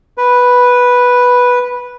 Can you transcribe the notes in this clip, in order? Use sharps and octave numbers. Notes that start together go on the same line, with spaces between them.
B4